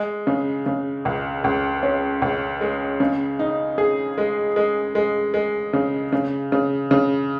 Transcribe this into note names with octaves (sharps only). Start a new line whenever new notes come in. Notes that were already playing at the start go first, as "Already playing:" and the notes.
Already playing: G#3
C#3
C#3
C#2
C#2
C#4
C#2
G#3
C#3
D#4
G#4
G#3
G#3
G#3
G#3
C#3
C#3
C#3
C#3